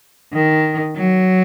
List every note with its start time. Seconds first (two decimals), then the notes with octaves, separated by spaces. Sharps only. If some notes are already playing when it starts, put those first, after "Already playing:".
0.34 D#3
0.96 F#3